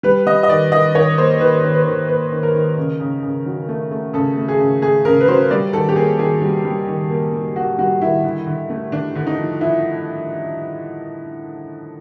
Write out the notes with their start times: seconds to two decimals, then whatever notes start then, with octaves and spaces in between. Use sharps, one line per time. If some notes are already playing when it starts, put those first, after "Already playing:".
0.03 G3 B4
0.27 G3 D#5
0.43 D#5
0.49 D#3 D5
0.72 D#3 D#5
0.95 D#3 C#5
1.18 A#3 C5
1.40 D#3 B4
1.64 D#3
1.75 B4
1.86 D#3
2.09 A#3 B4
2.32 D#3
2.43 A#4
2.54 D#3
2.77 C#3
3.00 C#3
3.23 C#3
3.46 F#3
3.69 A3
3.91 A3
4.13 C#3 A4
4.37 A3
4.48 G#4
4.59 C#3
4.82 A3 G#4
5.05 C#3 A#4
5.20 B4
5.28 F#3 C5
5.51 G3 D5
5.73 D#3 A4
5.89 G4
5.96 A#3 G#4
6.19 D#3 G#4
6.42 G3
6.65 G3
6.87 D#3
7.10 A#3
7.33 G3
7.55 A#3 F#4
7.78 G3 F#4
8.01 D#3 E4
8.24 D3
8.47 D3
8.70 A3
8.92 D3 D4
9.15 D3
9.27 D#4
9.38 F3
9.61 F3 E4